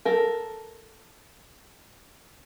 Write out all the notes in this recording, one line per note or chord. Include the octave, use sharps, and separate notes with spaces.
A4 A#4